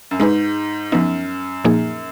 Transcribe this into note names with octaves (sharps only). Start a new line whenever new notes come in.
F#2
G#2 G#3 D#4 G#4 B4
F#2 F3 B3 D#4
A#2 F3 A#3 D#4 G#4